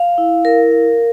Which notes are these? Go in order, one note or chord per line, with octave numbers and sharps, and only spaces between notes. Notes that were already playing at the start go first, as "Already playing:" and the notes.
Already playing: F5
E4
A#4
F5